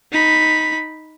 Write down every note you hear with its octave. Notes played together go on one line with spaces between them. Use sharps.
D#4 B5